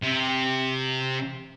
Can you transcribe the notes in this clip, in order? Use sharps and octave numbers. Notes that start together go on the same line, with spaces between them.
C3